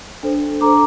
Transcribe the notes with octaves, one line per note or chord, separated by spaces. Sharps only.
D4 A4 C5
D4 A4 C5 A#5 D6